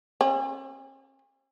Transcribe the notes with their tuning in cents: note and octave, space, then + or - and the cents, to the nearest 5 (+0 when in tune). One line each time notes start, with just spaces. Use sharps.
C#4 -45